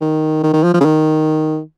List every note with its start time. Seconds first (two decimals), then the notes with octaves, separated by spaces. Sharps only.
0.01 D#3
0.44 D#3
0.54 D#3
0.63 F3
0.74 F3
0.80 C#3
0.85 D#3